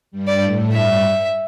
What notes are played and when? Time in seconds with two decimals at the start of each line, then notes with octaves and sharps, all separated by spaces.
0.11 G2 G3
0.28 D5
0.42 A2 A3
0.72 G2 G3 E5